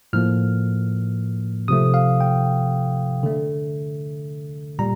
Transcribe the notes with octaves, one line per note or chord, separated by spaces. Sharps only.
A2 F3 A#3 F6
C3 F3 A3 D#6
F5
G5
D3 A3
A#2 G3 A#5